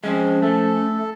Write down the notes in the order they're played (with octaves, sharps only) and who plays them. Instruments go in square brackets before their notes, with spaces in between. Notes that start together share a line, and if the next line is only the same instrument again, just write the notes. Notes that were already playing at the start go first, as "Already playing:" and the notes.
[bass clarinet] F3 [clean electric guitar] G#3 C4 [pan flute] C#4
[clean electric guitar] A3 [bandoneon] A4